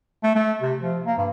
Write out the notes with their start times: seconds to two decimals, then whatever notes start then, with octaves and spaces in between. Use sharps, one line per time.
0.24 A3
0.36 A3
0.62 C3
0.81 F3
1.05 A#3
1.18 G2